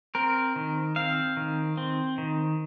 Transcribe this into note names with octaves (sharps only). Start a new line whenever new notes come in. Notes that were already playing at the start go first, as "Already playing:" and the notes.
C4 A#4
D#3
C4 F5
D#3
C4
D#3